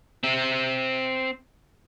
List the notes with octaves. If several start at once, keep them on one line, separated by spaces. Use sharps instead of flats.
C4 E5